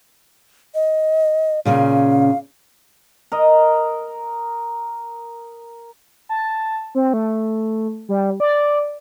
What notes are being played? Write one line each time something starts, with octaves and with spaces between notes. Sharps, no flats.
D#5
A#2 C#3 C#4 F5
A#4 D#5
A5
C4
A3
G3
D5